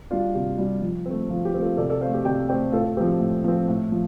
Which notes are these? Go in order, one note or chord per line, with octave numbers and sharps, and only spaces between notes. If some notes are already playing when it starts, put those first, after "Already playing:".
G3 D4 F4
C3 G4
G3 D4
F3
A3 C4
F3 F4
G4
A3 C4
F4 A4
C3 A4 D5
A4 D5
A3 C4 C5 F5
G4
C3 D5 G5
A3 C4 D5 G5
A2 F4 A4
F3 C4 G4
A2
F3 C4
A2
F3